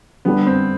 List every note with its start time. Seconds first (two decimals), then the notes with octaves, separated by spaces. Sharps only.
0.25 D3 G3 B3 D4
0.47 C4